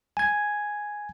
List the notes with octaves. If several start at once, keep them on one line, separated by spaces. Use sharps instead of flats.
G#5 G#6